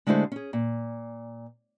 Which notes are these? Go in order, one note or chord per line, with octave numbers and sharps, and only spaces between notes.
D3 G#3 A3 E4 F#4 C5
C#4 G#4
A#2